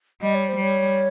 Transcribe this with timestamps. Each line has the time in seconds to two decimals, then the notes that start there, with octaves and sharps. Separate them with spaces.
0.22 G3 D#5
0.35 C#5
0.49 C5
0.56 G3
0.62 C#5